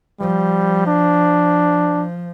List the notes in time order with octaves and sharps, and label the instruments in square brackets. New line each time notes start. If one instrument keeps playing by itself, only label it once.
[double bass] F3 [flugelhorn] G3
[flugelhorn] D4